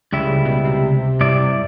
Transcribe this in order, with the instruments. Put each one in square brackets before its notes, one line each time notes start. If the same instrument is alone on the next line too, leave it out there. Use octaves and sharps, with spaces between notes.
[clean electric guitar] C#2 G3 E4 [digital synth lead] C#3
[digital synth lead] B2
C3
[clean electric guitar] G2 E4 D5